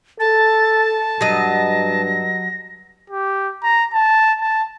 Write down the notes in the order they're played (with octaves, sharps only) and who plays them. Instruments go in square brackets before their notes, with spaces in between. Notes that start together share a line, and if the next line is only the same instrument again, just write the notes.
[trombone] A4 [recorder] A5 [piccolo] A6
[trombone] G2 [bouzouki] F#3 D#5 [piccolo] A#6
[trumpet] G4
A#5
A5
A5